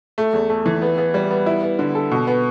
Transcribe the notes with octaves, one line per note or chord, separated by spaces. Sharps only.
A3
E2
A3
E3
B3
B3
G3
B3
E4
B3
D3
A4
B2
B3